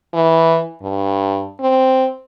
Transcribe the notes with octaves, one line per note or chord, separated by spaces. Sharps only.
E3
G2
C4